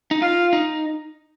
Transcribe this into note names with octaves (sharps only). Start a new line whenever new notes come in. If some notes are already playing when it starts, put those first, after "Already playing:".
D#4
F4 F5
D#4